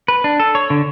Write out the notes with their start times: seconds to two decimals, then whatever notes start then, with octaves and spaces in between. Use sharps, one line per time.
0.08 B4
0.24 D4
0.40 A4
0.55 C#5
0.70 D3